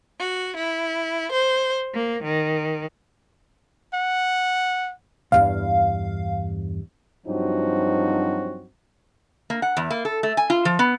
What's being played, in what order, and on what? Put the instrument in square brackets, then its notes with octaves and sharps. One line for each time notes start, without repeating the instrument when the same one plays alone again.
[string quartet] F#4
E4
C5
A#3
D#3
[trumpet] F#5
[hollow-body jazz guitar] B1 E2 G2 [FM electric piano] F5
[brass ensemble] G2 F3 F#3 C4 D#4 F#4
[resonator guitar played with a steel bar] A#3
F#5
E2
A#3
A4
A3
G#5
F4
F3
B3